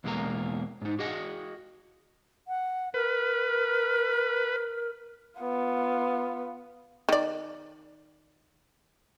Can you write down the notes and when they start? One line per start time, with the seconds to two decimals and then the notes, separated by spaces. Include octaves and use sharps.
0.04 E2 B2 G#3 A#3 A#5
0.82 G#2 D#4
0.99 F#4 G#4 D#5 F#5
2.48 F#5
2.94 A#4 B4
5.41 B3 F4
7.09 D#3 D5